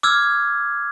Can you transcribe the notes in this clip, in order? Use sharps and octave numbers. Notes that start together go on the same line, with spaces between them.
D6 E6 F6 G#6